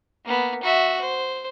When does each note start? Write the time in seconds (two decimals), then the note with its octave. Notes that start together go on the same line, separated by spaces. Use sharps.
0.25 A#3 B3
0.63 F#4 E5
1.01 C5